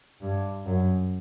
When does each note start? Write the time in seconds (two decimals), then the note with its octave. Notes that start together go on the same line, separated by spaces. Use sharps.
0.21 G2
0.66 F#2